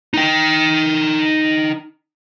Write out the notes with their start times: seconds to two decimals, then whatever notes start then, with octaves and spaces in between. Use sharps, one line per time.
0.14 D#4 G5